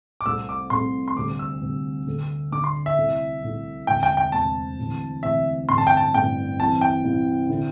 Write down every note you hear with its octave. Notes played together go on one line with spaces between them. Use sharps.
D6
C2 C3 A3 C4 E6
D6
C2 C3 A3 C4 C6
C6
D2 C3 G3 D6
E6
D2 C3 G3
D2 D3 A3
D2 D3 A3 D6
C6
E5
C2 C3 A3 E4
C2 C3 A3 E4
E1 D2 C3 G5
G5
G5
E1 D2 C3 A5
D2 C3 E3
D2 C3 E3 E5
A1 G2 D3 C4 C6
A5
G5
A5
A1 G2 D3 C4 G5
C2 C3 E3 C4 E4 A5
G5
C2 C3 E3 C4 E4
D3 C4 E4